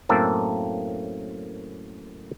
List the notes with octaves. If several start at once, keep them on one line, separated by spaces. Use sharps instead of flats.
F#2 A2 A#3 C4 A4